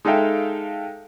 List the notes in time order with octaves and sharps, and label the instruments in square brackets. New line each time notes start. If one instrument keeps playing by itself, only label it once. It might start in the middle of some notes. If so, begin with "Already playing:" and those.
[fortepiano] G#3 D#4 A4 E5 F5 G5